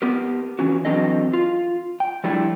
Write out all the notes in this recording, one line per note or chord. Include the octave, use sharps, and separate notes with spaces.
B3 G4 A#4
E3 C#4 F#4
E3 F#3 C4 D4 A4 D#5
F4
G5
F3 G3 A3 D4 E4